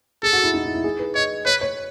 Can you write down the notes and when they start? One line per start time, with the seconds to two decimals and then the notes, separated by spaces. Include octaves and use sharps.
0.23 G#4 A4
0.33 F#4
0.43 E4
0.54 D#4
0.64 E4
0.74 E4
0.84 G#4
0.99 B4
1.15 C#5 D#5
1.46 B4 C#5
1.61 C#5